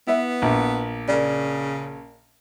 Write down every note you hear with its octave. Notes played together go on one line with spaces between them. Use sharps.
B3 E4 B4 E5
A#1
C#3 A#4 D5